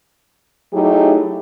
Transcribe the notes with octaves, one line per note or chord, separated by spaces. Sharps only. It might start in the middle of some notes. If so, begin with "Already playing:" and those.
F#3 A3 D#4 E4 G4 G#4